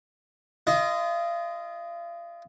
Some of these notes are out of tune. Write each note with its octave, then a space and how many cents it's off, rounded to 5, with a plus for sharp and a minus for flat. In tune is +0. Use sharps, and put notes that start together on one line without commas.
F4 -35 D#5 +0